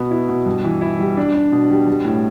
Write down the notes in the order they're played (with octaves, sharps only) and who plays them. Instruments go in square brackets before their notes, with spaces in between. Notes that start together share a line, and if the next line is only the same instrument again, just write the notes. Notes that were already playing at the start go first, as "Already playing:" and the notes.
Already playing: [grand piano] B2 B3
E4
B2
G2
E3
E4
G3
D4
D4
B2
G3
G3
A2